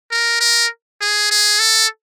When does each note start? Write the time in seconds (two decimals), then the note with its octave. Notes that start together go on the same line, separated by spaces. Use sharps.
0.11 A#4
0.41 A#4
1.01 G#4
1.31 G#4
1.59 A4